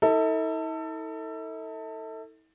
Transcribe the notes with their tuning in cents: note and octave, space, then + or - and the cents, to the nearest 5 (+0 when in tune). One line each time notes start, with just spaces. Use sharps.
E4 -45 A4 +25